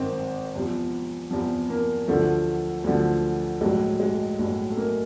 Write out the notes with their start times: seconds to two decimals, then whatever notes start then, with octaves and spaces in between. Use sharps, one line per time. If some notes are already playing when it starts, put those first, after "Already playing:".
Already playing: G#1 G#2 D#3 C4
0.55 E2 C3 F3
1.31 E2 C3 F3
1.70 A#3
2.08 D2 D3 F3 A3
2.84 D2 D3 F3
3.61 A#1 A2 F#3 G#3
4.00 G#3
4.39 A#1 A2 F#3
4.71 A3
4.77 A#3